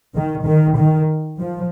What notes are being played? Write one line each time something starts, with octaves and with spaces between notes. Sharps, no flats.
D#3
D#3
D#3
F3